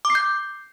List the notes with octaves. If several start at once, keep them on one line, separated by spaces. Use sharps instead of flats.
D6
C7
G6